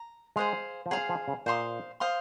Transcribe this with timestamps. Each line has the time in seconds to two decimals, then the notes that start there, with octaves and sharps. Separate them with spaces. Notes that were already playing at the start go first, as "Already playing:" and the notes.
Already playing: A#5
0.36 G#3 G#4 C5 F5
0.86 F3
0.91 F#3 G#4 C5 F5
1.09 F3
1.28 C#3
1.46 A#2 C5 F5 C6 D#6
2.00 C5 F5 C6 D#6